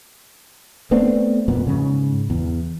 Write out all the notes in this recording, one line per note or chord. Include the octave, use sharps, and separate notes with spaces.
A3 B3 C4 D4
F2 A#2 B3
G#2 C#3
E2